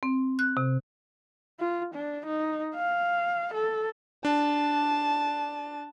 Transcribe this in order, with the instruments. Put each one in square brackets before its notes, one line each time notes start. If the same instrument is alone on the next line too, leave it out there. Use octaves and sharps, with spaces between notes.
[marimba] C4
F#6
C3
[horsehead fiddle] F4
D4
D#4
F5
A4
[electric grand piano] D4 [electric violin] A5